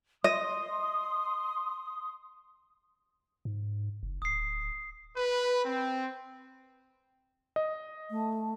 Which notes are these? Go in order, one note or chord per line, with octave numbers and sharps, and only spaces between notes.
D#5 C6 D#6
G#2
F#1
D1 D#6 C7
B4
C4
D#5
A3